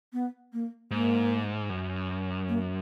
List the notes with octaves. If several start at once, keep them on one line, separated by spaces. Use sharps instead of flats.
B3
A#3
G#2 A#3
F#2
A#3